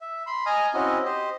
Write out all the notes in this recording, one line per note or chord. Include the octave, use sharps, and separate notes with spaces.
E5
B5 C6
D#5 G#5 A#5 D#6 F6
C4 C#4 E4 F#4 D#5
G4 C5 D#5